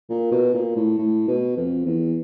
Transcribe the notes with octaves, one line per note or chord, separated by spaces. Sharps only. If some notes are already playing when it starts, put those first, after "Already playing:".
A#2
B2
A#2
A2
A2
B2
F2
E2